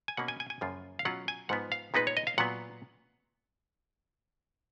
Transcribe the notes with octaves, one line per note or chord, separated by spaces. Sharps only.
G#5
B2 A#3 C#4 F#5
G#5
G#5
G#5
F#2 C#3 F3 A#3 F4
F5
B2 F#3 C#4 F4 F#5
G#5
G#2 F3 B3 F#5
F5
A#2 G#3 B3 D#4 B4
C#5
D#5
F5
A#2 F#3 B3 F#5